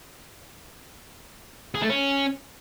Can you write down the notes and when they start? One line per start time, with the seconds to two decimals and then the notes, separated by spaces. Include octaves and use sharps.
1.75 G#4
1.82 A3
1.89 C#4